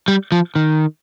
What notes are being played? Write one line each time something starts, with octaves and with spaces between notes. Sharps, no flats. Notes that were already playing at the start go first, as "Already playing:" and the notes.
G3
F3
D#3